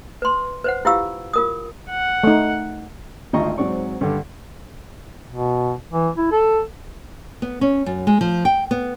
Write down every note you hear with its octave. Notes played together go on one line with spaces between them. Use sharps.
B4 C6
B4 C5 F#5
E4 F4 G4 F5 E6
F4 A#4 D#6
F#5
A3 D#4
G#1 D2 F4 D#5 A#5 C#6
G#2 F#3 C4 D5 C#6
G2 D3
B2
E3
E4
A4
B3
C#4
F#2
G#3
F3
G5
B3